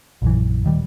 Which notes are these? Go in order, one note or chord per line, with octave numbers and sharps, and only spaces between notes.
A#1 F#2 E3
D#1 D#3 G3